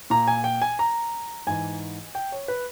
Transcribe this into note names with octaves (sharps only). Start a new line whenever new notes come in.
A#2 A#5
G#5
G5
G#5
A#5
G#2 E3 G#5
G5
C#5
B4